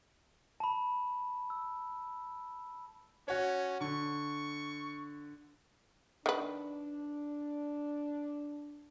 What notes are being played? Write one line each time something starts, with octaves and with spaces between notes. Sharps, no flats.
A5 B5
E6
C#4 F#4 C#5
D3 C#6
D#3 D4 B4